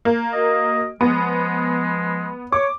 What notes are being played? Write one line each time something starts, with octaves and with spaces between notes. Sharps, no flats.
A#3
F#4 A#4 D#5
F3 G#3 B3
C#5 D6